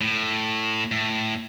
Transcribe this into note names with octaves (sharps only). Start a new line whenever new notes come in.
A2
A2